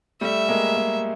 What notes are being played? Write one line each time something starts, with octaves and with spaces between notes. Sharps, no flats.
G3 A3 E5
G#3 A#3
G#3 A#3